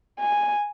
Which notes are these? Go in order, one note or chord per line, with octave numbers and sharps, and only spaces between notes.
G#5